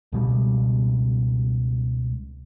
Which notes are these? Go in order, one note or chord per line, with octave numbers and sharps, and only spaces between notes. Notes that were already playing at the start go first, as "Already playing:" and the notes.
C#2 B2 G3